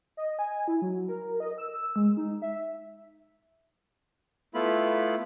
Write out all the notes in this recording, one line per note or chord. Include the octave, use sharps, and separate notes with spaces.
D#5
G#5
E4
F#3
A#4
D#5
E6
G#3
D#4
E5
A3 B3 E4 F4 B5